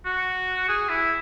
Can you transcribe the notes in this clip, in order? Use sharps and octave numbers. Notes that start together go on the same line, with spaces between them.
F#4
G#4
E4